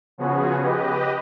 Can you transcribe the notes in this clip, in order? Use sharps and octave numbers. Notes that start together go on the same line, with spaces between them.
C#3 F3 B3 C#4 F#4 G#4
G4 B4 D#5